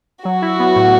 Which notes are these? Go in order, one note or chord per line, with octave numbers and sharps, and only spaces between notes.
F#3 F#4
E4
B3
A2